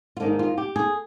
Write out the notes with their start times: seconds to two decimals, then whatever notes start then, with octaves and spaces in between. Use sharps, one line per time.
0.17 F4
0.20 G#2 D#3 A#3 D4 D#4
0.39 F4
0.58 G4
0.76 G#4